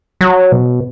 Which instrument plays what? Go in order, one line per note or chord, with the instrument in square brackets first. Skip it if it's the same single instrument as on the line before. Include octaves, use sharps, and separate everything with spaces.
[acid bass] F#3
B2